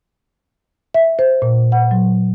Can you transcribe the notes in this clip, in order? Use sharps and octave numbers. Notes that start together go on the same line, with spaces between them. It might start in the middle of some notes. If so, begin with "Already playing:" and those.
E5
C5
A#2
F#5
F#3